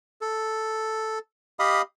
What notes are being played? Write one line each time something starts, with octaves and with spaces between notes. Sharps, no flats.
A4
G4 D#5 F5 B5 D#6